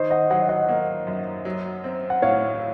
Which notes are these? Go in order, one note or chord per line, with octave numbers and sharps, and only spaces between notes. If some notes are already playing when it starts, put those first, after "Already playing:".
Already playing: D#3 C5 D#5
D#5 F#5
F#3 D#5 F#5
D#5 F#5
A#3
F#2
F#3
C4
F#5
A2 C#5 F5